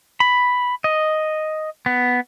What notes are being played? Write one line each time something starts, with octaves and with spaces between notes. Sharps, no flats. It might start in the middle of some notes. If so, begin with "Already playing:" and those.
B5
D#5
B3